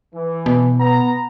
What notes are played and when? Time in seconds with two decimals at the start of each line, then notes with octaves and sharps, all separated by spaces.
0.15 E3
0.46 B2
0.79 B3 A#5